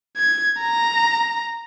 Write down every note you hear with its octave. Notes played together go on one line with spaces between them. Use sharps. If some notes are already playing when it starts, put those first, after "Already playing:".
G#6
A#5